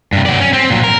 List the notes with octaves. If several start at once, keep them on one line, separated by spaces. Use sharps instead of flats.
G2 C3
F#3 D5
C#4
C4
A#2 F#3
A#4